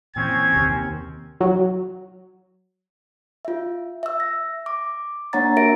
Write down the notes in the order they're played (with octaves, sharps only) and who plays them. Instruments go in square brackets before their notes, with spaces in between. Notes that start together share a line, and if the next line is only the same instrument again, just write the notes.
[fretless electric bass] A#2 E3 [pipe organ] C4 C#4 [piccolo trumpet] G#6
[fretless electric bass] D#2 C3
[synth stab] F#3
[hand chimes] F4 E5
E5 E6
A#6
D6
A#3 D4 C#5 F#5 A#5 A6
F#4 A#4 E5 A#6 D7